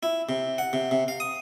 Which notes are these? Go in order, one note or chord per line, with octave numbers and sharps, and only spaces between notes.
E4
C3
F#5
C3
C3
F5
D#6